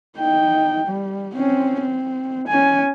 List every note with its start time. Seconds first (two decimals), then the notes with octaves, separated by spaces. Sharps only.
0.18 D#4 G5
0.87 G3
1.35 C4 C#4
1.80 C4
2.48 C#4 G#5